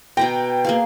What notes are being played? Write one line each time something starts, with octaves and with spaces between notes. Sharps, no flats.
B2 B4 G5 A#5
A#3 G#4 F5